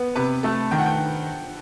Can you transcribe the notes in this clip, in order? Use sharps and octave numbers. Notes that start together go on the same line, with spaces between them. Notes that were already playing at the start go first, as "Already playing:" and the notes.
Already playing: B3
C3 B4
A3 A4
D#3 G5
F#5
G5